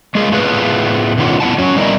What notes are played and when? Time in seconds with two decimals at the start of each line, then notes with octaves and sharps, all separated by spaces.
0.15 G#3 A#3 F4 G#4
0.32 A2 A3 B3 F4 G#4 B4
1.18 B2 D3 D#3 C#4 F4 F#5
1.40 B3 E4 F#5 A5
1.58 F#3 C#4 F#4 C#5
1.76 G3 B3 E4 A#4 D#5